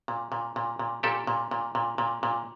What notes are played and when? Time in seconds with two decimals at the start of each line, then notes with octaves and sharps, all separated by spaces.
0.08 A#2
0.32 A#2
0.56 A#2
0.79 A#2
1.03 A#2 G4 A4
1.27 A#2
1.51 A#2
1.75 A#2
1.98 A#2
2.23 A#2